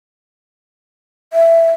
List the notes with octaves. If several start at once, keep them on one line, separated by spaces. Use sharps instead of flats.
E5